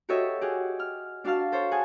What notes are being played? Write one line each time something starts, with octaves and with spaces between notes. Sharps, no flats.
F#4 G4 A4 C#5 D#5 E5
G4 G#4 F#5
F6
D4 F#4 F5 A5 F6
A4 C5 C#5
G#4 F#5 G#5 A5